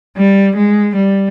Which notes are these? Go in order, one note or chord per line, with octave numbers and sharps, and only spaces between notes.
G3
G#3
G3